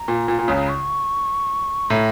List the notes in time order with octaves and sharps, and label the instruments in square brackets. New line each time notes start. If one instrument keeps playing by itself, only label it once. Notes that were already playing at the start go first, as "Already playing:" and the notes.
Already playing: [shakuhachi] A#5
[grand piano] A#2
A#2
A#2
C#2 C#3
[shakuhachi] C#6
[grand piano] A2 [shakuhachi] A#5